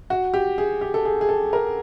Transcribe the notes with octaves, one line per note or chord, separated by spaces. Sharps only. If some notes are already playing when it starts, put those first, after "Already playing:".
F#4
G4
G#4
G4
A4
G#4
G#4
A4
A#4